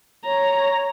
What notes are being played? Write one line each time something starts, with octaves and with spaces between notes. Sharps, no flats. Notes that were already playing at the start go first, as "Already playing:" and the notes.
C#5 A#5